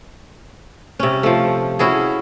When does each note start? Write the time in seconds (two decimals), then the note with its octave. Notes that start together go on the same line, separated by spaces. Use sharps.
0.99 C3 C#4
1.23 F3 A3
1.79 C#4 E4 F#4 G#4